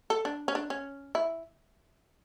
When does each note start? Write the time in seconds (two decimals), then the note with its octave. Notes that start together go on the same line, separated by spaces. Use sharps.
0.10 A4
0.25 D4
0.48 C#4
0.55 D4
0.70 C#4
1.15 E4